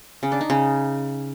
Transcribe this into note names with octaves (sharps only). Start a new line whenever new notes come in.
C#3
D4
D#4
C#3